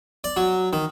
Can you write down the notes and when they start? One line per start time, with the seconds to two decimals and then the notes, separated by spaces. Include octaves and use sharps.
0.24 D5
0.37 F#3
0.73 D#3